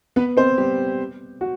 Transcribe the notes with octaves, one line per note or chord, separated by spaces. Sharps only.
B3 B4
C4 C5
G3 G4
F#4